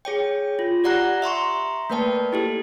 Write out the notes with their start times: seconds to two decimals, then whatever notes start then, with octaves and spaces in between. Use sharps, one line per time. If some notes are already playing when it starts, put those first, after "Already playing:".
0.05 G#4 C#5 G5
0.59 F4
0.84 G4 D5 F#5 A#5 F#6 A#6
1.22 E5 A#5 C6 C#6
1.90 A3 A#3 B4 D5 G5 A5
2.33 E4 G4 A4